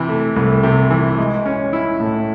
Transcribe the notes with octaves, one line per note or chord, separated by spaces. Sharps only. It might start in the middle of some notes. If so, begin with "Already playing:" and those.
Already playing: C3 E3
A3
C2
C3
E3
G#3
C#4
E4
A2